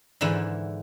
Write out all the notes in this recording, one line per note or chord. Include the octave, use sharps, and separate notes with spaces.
G#2 D3 E3 E4